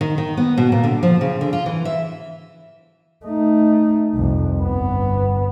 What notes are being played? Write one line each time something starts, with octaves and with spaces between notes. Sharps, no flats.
D#3
D#3
B3
B2
A#2
D3
F3
C#3
D3
F4
E3
E5
A3 D#4
C2 F2
G1 B3